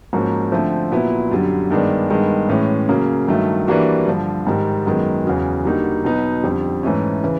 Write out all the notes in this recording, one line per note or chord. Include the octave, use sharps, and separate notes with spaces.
G#2 F3 A#3 C#4 F#4
D3 F3 A3 C4
A#2 F#3 B3 E4
F#2 D3 G3
G2 D#3 G#3 B3 D4
G2 D#3 G#3 B3
A2 E3 G#3 C#4
C#3 F#3 A#3
G2 D#3 F#3 A3
E3 G3 A#3 D4 F#4
G2 D3 F3
G#2 D#3 G3
F#2 D#3 G#3 B3
E2 C#3 F#3
D3 G3 A#3 D#4 F#4
B2 F#3 B3 D#4
F2 D3 G3
G#2 E3 A3 C#4
C#3 E3